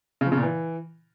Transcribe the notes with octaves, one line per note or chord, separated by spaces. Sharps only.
C#3
F3
C#3
A#2
E3